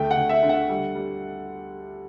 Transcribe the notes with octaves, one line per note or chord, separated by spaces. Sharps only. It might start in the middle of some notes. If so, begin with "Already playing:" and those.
Already playing: D2 A3 G5
F#5
D2
E5
D3
F#5
G3
G3